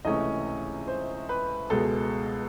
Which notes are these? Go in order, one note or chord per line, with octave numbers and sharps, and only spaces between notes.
C#2 C3 E3 A3 C#4 D#5
C5
B4
C#2 B2 G#3 A4